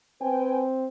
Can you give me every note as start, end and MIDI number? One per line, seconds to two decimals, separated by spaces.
0.22 0.88 60
0.22 0.64 71
0.22 0.64 79
0.22 0.64 80